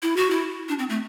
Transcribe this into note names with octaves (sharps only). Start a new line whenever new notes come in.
E4
F#4
E4
D4
C4
A3